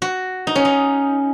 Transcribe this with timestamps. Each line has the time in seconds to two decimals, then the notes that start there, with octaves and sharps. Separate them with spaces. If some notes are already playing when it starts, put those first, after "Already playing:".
0.02 F#4
0.47 D#4
0.55 C#4
0.65 D#4